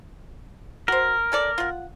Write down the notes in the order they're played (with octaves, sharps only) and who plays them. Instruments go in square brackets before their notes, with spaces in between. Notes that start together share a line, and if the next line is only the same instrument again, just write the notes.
[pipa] F#4 C5 [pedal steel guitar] A#4
[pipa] C#4 A4 D5
F4 F#5